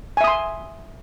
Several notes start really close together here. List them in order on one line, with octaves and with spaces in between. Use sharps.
G#5 E5 D#6 C6